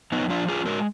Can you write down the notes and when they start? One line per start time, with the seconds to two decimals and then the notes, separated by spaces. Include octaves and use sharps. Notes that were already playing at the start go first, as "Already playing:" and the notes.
0.12 F2 B3 D#4
0.30 F3 D4 F4
0.48 F2 F4 G#4
0.65 G#3 F#4 A#4